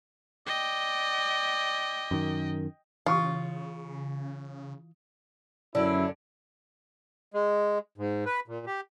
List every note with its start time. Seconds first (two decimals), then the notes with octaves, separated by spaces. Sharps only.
0.47 D5 D#5 G5
2.11 F#2 D#3
3.06 C#3 E3 F4 C#6 D#6
5.75 F#2 D3 C#4 D4 E4
7.34 G#3
7.98 G#2
8.26 B4
8.48 A#2
8.66 G4